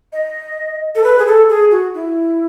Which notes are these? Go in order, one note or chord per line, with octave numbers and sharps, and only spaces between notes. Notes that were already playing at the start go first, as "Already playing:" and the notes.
D#5
A4
B4
G#4
A4
G#4
F#4
E4